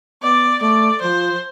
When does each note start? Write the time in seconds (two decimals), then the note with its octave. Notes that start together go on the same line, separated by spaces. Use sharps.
0.23 B3 D5
0.61 A3 D5
1.01 F3 C5